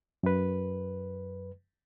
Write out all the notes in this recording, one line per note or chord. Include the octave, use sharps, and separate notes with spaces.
F#2 B4